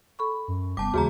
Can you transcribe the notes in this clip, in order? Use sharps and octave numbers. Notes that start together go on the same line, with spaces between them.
A4 B5 C#6
F#2
F1 G3 B3 A5 D6
D#2 C#3 E3 G#3 F#4 G#4 A#5